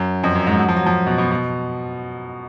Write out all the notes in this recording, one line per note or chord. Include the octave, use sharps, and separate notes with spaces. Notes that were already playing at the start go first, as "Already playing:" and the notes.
Already playing: F#2
F2
F#2
G#2
F#3
F3
F#3
F3
B2
B2
B2